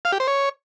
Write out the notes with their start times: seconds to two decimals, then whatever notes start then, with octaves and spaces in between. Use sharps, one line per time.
0.05 F5
0.12 G4
0.20 C5
0.28 C#5